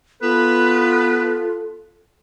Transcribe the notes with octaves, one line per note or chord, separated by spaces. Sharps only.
B3 F4 A4 B4